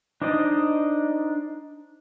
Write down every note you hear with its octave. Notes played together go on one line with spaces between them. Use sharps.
D4 D#4 C5 D5 D#5